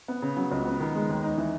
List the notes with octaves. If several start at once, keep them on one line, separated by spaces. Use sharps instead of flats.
B3
C#3
F#3
C#2
B3
D#3
G#3
D#2
D#4
E3